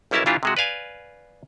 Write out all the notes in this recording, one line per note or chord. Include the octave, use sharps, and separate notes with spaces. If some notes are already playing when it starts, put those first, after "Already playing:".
B1 G3 C#4 E4 A#4 A5
A#2 E3 D4 E4 F4 G4
C3 G#3 F#4
B4 D5 F5 G#5